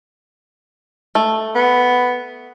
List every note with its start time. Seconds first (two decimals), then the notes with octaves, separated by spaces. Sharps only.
1.15 A3
1.55 B3